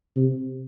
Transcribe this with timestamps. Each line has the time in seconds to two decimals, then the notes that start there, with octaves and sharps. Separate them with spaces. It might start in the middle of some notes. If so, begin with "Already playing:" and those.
0.16 C3